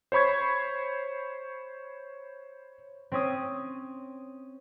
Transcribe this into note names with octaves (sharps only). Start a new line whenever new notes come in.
C5 C#5 B5 C#6 G#6
C4 C#4 D#6